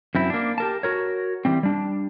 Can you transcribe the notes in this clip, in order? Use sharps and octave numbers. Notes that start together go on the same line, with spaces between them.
F#2 C4 E4
A#3 D4
G4 A#4 A5
F#4 A#4 C#5
E3 G3 C4
G3 D4